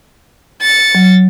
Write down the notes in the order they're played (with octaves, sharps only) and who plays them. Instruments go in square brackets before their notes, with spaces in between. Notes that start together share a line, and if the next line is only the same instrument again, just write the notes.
[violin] A6 C#7
[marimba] F#3